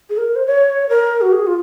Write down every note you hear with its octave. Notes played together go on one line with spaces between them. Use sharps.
G#4
A#4
C5
C#5
A#4
F#4
G#4
F4